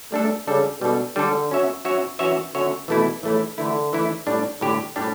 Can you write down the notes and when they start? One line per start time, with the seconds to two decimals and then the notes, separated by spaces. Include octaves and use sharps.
0.12 G3 A3 D4 A4
0.47 C#3 G3 D4 A4
0.81 B2 G3 D4 A4
1.16 D3 G3 D4 A4
1.50 F#3 C#4 F#4 C#5 E5
1.85 F#3 C#4 F#4 C#5 E5
2.19 E3 F#3 C#4 F#4 C#5 E5
2.54 D3 F#3 C#4 F#4 C#5 E5
2.88 B2 E3 A3 E4
3.23 A2 E3 A3 E4
3.58 D3 E3 A3 E4
3.93 E3 A3 E4
4.27 A2 G3 D4 G4
4.61 A2 D3 G3 D4 G4
4.96 A2 G3 D4 G4